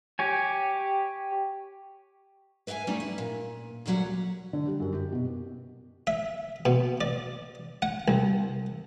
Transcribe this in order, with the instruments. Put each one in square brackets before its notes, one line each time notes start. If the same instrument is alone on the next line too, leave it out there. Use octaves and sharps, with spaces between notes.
[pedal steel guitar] G4 C#5 G#5
[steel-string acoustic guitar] B4 E5 F5 G5 G#5
G3 A3 C#4 D#4 G4
E4
A#2
D2 A#2 C#3 F#3 G3 F#5
[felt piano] D3
G3
F#2
G4
B2
[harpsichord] E5
B2
D5
F#5
C2